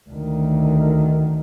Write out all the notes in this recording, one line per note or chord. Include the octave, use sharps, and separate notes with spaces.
D2 D#3